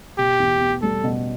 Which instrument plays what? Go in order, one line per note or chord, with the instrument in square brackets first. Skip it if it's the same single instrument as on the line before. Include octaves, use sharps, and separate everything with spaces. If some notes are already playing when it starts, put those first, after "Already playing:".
[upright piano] B2 [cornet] G4
[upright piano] E2
B3
[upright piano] G3 [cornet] A4
[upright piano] B2